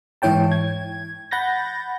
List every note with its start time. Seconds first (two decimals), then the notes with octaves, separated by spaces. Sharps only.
0.22 G#2 E3 E4 C#5 G5 A5
0.52 G#6
1.31 F#5 B5 G6 A6 A#6